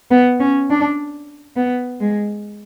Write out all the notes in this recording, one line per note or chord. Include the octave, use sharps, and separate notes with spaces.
B3
C#4
D4
B3
G#3